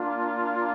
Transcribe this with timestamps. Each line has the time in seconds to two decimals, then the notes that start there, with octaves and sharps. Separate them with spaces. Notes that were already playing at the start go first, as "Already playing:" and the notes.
Already playing: A#3 D4 F4